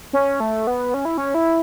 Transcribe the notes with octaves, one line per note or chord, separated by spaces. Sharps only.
C#4
A3
B3
C#4
E4
C#4
E4